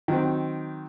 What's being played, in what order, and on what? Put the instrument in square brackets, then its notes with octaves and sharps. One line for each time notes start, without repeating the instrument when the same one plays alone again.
[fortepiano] D#3 F#3 C4